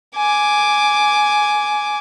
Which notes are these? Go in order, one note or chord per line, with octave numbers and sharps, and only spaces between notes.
G#5 D6